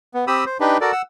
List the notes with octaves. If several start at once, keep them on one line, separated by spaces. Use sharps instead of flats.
B3
C4 G4 B5 D#6 E6
C5
D4 D#4 G4 B4
F#4 A4 A#4 D5
F#5 E6